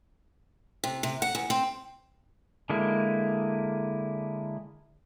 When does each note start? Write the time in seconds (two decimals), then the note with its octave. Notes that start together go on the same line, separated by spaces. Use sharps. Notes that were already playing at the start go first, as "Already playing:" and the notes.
0.84 C3
1.03 C3
1.22 F#5
1.35 E2
1.50 C4
2.69 D3 G#3 A#3 E4